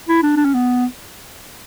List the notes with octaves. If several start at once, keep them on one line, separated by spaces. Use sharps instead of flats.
E4
D4
D4
C#4
B3